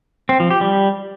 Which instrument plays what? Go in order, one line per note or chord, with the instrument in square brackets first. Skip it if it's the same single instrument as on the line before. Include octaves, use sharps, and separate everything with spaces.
[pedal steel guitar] C4
F3
G4
G3